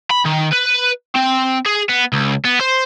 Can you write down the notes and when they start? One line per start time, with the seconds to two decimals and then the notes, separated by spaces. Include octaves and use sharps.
0.10 B5
0.25 D#3
0.52 B4
1.15 C4
1.66 G#4
1.89 B3
2.13 C#2
2.45 B3
2.61 C5